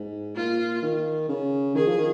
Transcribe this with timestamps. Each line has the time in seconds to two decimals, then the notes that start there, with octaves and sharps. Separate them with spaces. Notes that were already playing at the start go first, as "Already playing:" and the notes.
Already playing: G#2
0.36 A#2 F4
0.83 D#3
1.29 C#3
1.75 D#3 G#4
1.87 F3
1.98 D#3